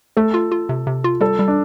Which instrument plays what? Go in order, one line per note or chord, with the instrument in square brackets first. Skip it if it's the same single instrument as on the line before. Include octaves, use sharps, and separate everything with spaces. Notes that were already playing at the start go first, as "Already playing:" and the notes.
[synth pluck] A3 [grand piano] A4
[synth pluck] F4
F4
C3
C3
F4
[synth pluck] G3 [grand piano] A4
[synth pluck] G3
[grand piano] D4